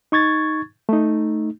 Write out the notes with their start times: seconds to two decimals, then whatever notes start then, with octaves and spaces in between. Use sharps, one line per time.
0.12 D#4 C#6 G#6 A6
0.89 A3 D#4